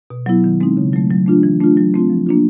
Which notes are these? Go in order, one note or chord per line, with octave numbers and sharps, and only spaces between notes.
B2
F#3 B3 E4
D#3
G#3 C4 D#4
C#3
F#3 A3
F#3
A3 D4 F4
E3
A3 D4 F4
F#3
A3 C4 F4
F3
A#3 D4 F4